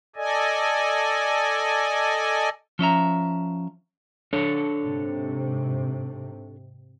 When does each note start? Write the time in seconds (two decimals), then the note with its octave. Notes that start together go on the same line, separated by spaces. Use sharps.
0.16 A4 D5 D#5 G#5
2.79 F3 C#4 E5 A#5
4.33 D4 A4 C#5
4.82 G#2 C3